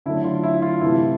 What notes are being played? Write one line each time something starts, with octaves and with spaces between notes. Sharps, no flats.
D3 F#3 A3 E4
F4
E4
F4
C3 E3 A3 E4